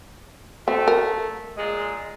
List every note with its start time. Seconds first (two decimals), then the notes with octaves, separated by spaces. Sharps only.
0.68 A3 C4
0.88 A#4
1.57 A#2 G#3